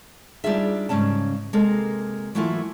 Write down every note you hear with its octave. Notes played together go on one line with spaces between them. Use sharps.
G3 D4 D#4 F4 G#4 E5
G#2 C#3 G3 C#4 A5
C3 G#3 A#3 A4 A#4 C5
E3 F#3 A3 A#3 E4 F4